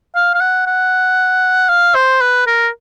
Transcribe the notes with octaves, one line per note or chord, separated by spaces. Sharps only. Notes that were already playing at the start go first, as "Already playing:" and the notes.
F5
F5
F#5
F#5
F5
C5
B4
A#4